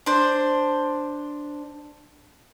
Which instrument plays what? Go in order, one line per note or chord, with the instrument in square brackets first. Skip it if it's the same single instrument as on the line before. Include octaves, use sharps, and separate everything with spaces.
[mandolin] D4 C5